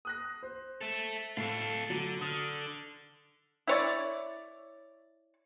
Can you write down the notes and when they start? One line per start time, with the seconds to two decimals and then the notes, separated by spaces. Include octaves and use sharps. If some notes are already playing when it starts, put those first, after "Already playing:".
0.05 D#6 F#6 A#6
0.43 C5
0.81 A4 E5
1.37 A2 A3 A4 F5
1.90 D3 F#3
2.21 D3 D#6 F6
3.67 E4 C#5 D5